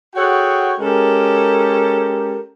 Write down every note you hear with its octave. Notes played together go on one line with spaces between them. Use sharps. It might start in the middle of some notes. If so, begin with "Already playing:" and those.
F#4 G#4 A4 C#5 F#5 G5
G#3 C#4 G4 A4 A#4